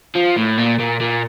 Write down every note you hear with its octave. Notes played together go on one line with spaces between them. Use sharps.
F3
A2
A#2
A#2
A#2